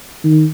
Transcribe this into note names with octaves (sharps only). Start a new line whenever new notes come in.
D#3